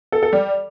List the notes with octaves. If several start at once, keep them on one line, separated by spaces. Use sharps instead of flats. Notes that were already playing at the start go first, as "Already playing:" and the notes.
A4
A4
G3